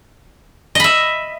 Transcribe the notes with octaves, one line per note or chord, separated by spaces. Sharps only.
D#5 E5 B5